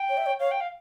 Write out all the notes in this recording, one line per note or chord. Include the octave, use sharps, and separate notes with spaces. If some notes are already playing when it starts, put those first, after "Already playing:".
Already playing: G5
C#5
E5
C#5
C#5 F5
G5
F5